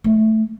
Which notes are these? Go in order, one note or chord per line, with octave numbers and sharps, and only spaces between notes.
A3